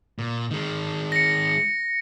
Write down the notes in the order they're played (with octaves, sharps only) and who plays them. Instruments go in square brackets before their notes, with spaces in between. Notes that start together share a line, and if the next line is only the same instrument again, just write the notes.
[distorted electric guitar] A#2
D#3 G#3
[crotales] A#6 C#7